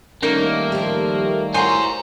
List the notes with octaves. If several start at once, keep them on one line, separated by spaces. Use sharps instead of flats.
D#3 G3 A3 A#3 C#4 D#4 A#4
F3 G4
E4 F#4 C5 C#5 G#5 A#5 C6